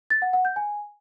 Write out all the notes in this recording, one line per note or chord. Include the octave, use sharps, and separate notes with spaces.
A6
F#5
F#5
G6
G#5